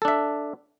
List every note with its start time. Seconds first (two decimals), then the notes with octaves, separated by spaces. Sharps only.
0.02 A4
0.05 D4
0.08 E5